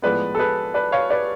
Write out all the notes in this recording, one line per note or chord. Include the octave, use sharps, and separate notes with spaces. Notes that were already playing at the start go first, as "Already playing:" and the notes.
A2 F3 G#3 B3 B4 D5
A4
G#4 B4
B4 D5
C#5 F5
B4 D5